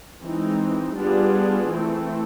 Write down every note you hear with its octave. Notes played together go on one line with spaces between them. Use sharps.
E3 G#3 C4 D#4
G3 B3 D4 F4 G#4
E3 A3 C4